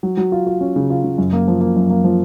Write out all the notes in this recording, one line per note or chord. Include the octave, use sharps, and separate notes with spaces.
F#3
F#3
F4
F4
C#4
C#3
F4
C#3
F#2
A#3
F3
A#3
F#2
A#3
F3